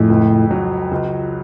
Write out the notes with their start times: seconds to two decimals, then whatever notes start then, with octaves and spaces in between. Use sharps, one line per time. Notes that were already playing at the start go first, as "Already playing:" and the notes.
Already playing: F2 A2 G#3
0.09 C#2
0.51 F#3
0.91 C#2